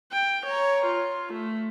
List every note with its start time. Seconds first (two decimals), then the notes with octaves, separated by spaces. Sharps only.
0.12 G5
0.46 C#5 A#5
0.85 F4
1.33 A3